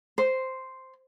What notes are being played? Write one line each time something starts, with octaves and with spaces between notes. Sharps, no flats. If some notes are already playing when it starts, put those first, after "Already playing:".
C5